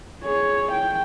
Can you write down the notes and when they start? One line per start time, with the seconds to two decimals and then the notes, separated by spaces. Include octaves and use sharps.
0.23 G#4 C#5
0.72 G5